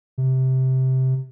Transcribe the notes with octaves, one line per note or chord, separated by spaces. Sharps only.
C3